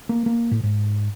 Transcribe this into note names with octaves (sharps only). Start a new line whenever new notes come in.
A#3
A#3
A2
G#2